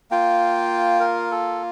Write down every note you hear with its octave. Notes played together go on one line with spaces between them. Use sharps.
A#3 F4 G5
A#4
A4